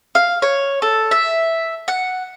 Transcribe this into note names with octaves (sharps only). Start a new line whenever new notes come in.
F5
C#5
A4
E5
F#5